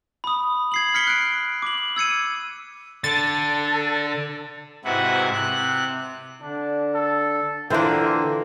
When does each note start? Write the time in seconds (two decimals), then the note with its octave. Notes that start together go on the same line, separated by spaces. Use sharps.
0.24 B5 D#6
0.72 G#6 C7 F#7
0.94 F6 B6 C#7 G7
1.07 F#6 D7
1.62 D6 F#7
1.96 E6 G#6 C#7 D#7
3.04 D3 A4 A6
4.85 G#2 C3 E4 F#4 B4 F#5
5.33 C3 F#6
6.41 D3 D4
6.94 A4
7.70 D3 E3 A#3 D4 F4 C5 G5